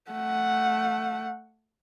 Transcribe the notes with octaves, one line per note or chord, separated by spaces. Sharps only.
A3 F#5